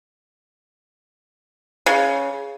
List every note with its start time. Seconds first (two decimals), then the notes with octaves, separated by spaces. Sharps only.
1.86 C#3